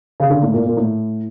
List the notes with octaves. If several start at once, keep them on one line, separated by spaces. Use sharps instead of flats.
C#3
D3
A2
A#2
A#2
A2